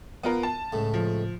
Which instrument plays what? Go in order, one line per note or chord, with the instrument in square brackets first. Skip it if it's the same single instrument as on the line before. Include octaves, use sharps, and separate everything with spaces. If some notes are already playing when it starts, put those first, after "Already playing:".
[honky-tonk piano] B3 F4 A#4
A5
[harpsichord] C#2 A2
[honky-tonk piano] F3